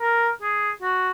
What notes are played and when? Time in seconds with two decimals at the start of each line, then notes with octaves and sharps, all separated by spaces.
0.01 A#4
0.42 G#4
0.82 F#4